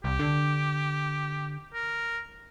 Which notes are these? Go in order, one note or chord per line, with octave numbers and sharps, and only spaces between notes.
C2 G4
D3
A#4